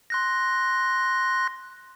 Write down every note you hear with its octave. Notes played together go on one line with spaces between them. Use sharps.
C6 F#6 A#6